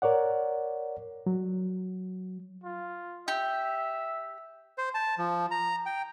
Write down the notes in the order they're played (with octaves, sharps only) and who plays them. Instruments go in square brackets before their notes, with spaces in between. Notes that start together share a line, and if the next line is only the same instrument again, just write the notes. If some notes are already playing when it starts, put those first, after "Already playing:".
[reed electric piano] A#4 C#5 D5 F#5
F#3
[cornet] F4
[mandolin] G4 [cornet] E5
[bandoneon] C5
A5
F3
A#5
G5